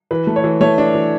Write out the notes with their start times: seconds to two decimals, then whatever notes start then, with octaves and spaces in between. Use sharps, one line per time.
0.11 E3 B4
0.27 A3
0.36 C#5
0.44 E3
0.61 A3 C#5
0.78 D4
0.95 E3